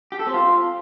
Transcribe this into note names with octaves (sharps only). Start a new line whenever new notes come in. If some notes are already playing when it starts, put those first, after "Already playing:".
G4
A4
C4
F4